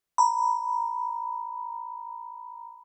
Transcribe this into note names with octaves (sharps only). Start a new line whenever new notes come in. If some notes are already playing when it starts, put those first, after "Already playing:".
A#5 B5